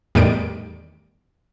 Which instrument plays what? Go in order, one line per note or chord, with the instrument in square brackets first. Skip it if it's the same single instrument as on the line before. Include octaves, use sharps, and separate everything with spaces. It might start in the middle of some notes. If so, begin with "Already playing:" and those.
[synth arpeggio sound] E2 A2 D#3 G3 D7